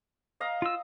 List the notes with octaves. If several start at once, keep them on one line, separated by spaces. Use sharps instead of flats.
D#5 F5 A#5
F4 E6